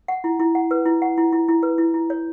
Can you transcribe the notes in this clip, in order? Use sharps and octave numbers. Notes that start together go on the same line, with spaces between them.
F#5
E4
E4
F#5
B4
E4
F#5
E4
E4
E4
B4
E4
E4
C#5